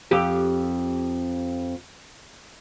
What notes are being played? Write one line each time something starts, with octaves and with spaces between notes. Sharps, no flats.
F2 G4